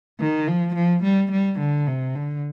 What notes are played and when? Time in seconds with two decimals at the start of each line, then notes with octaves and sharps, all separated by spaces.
0.20 D#3
0.47 F3
0.75 F3
1.03 G3
1.31 G3
1.59 D3
1.87 C3
2.15 D3